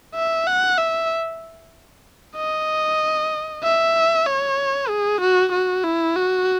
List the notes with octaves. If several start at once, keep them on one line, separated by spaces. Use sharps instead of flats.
E5
F#5
E5
D#5
E5
C#5
G#4
F#4
F#4
E4
F#4